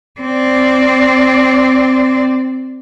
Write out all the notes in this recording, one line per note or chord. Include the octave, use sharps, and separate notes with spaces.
C4 D5